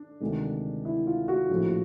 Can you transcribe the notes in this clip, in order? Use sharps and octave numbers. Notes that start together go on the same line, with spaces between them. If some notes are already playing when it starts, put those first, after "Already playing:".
Already playing: D4
D2 C3 D#3 G#3
E4
F4
F#4
A#1 A2 F3